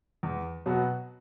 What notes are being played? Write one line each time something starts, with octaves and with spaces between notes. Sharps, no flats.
E2
B2 F#3 B3 F#4